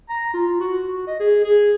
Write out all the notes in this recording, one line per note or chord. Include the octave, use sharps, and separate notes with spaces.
A#5
F4
F#4
F#4
D#5
G#4
G#4